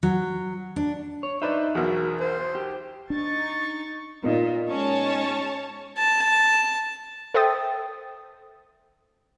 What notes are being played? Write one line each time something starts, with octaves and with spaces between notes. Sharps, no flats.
F#3
D4
C#5
D4 D#4 B4 C5 E5
B1 E2 F#4 G#4 A#4
C5
G4
D4 D#4 C#6 A6
A#2 B3 D#4
G#3 C#4 C#5 A5
A5
A4 C5 E5 G5 D#6 A6